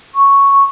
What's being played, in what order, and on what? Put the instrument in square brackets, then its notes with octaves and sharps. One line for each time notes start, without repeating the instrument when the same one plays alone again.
[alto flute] C#6